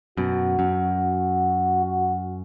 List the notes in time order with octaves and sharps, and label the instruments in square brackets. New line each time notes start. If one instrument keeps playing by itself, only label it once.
[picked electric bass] F#2 B2 [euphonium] F#4
[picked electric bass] F#2
[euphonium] F#4